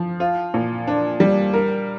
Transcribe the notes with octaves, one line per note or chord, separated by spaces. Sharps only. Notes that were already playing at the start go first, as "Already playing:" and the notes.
Already playing: F3
F4
A#2
D4
G3
A#4